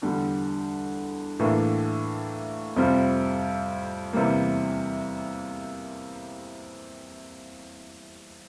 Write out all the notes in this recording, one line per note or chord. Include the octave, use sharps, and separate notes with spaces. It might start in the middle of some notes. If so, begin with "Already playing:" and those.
E2 D3 G3
A2 E3 A#3 D4
F2 C3 G3 C4 F4
E2 C3 E3 G3 A#3